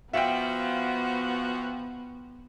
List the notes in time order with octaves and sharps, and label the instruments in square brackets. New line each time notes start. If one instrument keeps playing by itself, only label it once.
[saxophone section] F3 F#4 [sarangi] B3 [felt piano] E5 F5 G5